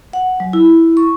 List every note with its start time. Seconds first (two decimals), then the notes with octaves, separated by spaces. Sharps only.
0.13 F#5
0.40 F#3
0.53 E4
0.97 C#6